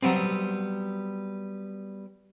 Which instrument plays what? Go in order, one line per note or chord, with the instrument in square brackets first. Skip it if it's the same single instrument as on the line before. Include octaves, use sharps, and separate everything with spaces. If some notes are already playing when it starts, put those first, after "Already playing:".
[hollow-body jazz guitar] F#3 G3 B3 C4